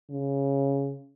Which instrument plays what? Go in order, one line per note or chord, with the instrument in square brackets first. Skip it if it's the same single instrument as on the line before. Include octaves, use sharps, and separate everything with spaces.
[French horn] C#3